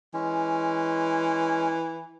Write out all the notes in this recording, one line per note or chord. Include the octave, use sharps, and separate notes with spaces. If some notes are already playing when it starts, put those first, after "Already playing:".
E3 G#3 C#4